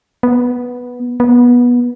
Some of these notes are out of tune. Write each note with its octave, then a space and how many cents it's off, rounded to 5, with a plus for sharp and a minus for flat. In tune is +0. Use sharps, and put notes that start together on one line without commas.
B3 -5
B3 -20